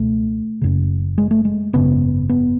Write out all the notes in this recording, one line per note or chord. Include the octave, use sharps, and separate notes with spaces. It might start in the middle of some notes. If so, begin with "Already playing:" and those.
Already playing: C#2 B2 A3
F#1 F#2 C#3
G#3
A3
G#3
G#1 F#2 C#3 B3
B3